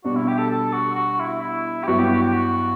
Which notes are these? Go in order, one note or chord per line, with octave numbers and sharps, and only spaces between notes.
B2 G3 D4 F#4
E4
G4
A4
A4
F#4
F#4
E4
E4
G4
G2 F#3 B3 E4 F#4
G4
F#4
G4
F#4